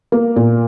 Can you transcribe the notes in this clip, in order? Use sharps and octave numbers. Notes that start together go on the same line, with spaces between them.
A#3
A#2